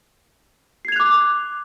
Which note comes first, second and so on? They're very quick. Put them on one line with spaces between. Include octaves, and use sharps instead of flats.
C7 G#6 F7 F#6 D6